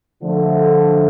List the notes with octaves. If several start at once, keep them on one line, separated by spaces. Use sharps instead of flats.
D3 F3 A3